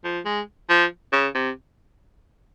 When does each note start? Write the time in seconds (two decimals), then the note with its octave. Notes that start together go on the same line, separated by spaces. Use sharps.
0.04 F3
0.25 G#3
0.69 F3
1.13 C#3
1.35 C3